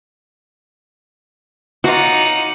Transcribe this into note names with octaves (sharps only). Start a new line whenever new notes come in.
F#3 D#4 F4 F#4 F#5 D6